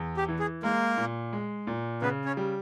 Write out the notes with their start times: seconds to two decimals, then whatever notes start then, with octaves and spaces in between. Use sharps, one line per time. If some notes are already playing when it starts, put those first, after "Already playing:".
Already playing: E2
0.17 G4
0.28 E3
0.40 G#4
0.63 G#3 A#3 A#4
0.98 A#2
1.33 G#3
1.67 A#2
2.02 C#3 B3 B4
2.25 C#4 C#5
2.37 G3